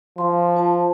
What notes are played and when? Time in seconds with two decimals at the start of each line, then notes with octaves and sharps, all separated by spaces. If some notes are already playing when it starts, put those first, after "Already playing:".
0.18 F3 F5 C6
0.55 F4 C5 A5